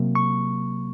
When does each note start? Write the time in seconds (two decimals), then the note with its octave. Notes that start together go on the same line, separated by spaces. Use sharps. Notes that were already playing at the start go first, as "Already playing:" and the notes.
Already playing: C3 F#3 A#3
0.15 C#6